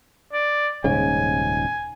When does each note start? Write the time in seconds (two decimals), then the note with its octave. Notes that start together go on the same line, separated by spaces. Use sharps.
0.33 D5
0.84 D#1 G#2 C#3 G#5